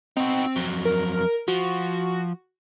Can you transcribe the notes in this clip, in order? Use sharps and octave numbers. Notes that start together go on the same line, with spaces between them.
C4 D#4 F#4
F2 F#3
A#4
F3 F#4